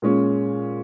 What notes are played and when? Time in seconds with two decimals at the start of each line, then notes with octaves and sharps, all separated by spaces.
0.02 A#2 G#3 C#4